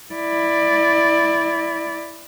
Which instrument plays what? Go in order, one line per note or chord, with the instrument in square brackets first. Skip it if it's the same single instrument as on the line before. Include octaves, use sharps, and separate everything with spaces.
[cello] E4 D5